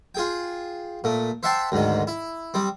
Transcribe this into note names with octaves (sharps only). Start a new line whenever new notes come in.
F4 G#4 G5
A#2 A3
C5 E5 F#5 G5 A5 C6
D2 G#2 D#3
E4
G3 C4